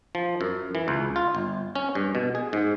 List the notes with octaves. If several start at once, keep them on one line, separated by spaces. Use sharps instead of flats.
F3
F#2
E3
C#2
F4
G1
C#4
G2
B2
G#4
G#2